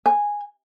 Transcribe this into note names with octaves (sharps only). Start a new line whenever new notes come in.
G#5